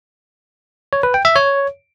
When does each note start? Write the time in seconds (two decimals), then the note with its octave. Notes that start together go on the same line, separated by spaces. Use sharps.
0.93 C#5
1.03 B4
1.14 G5
1.25 E5
1.36 C#5